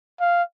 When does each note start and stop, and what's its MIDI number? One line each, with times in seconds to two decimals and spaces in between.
0.20 0.43 77